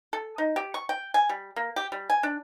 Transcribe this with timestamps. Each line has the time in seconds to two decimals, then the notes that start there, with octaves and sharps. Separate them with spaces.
0.13 A4
0.38 D#4
0.56 G4
0.74 C#6
0.89 G5
1.14 G#5
1.29 G3
1.56 A#3
1.76 G4
1.92 G3
2.10 G#5
2.23 D4